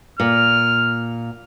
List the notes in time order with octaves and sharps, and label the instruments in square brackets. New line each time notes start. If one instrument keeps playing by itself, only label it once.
[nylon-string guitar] A#2 [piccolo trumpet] F6